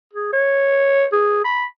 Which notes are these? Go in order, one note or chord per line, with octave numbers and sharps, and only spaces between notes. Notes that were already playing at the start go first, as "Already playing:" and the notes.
G#4
C#5
G#4
B5